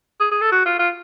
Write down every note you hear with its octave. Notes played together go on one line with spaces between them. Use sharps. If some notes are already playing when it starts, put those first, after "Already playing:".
G#4
G#4
A4
F#4
F4
F4